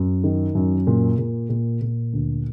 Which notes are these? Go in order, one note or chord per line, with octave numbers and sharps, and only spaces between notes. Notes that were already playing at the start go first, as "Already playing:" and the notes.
Already playing: F#2
D#3
F#2
A#2
A#2
A#2
A#2
D2